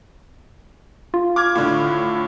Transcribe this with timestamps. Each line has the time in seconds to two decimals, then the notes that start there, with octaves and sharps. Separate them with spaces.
1.14 F4
1.36 D6 F6 G#6
1.55 A2 D3